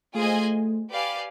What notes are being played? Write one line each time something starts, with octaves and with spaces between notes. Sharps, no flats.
A3 F4 G#4 C5 D#5 G#5
G4 B4 D5 F5 G#5